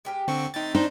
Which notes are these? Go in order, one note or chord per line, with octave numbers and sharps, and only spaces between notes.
G#3 G4 A#4
D3 A#3 C4 E4 F#4 C#6
D#3 A3 C4 D#4 A6
D4 D#4 C5